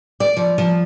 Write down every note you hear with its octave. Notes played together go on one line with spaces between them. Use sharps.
D5
F3
F3